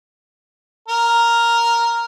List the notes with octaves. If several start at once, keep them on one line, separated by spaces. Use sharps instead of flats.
A#4